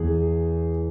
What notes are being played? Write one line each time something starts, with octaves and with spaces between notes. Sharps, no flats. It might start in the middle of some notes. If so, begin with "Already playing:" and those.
Already playing: E2 G#4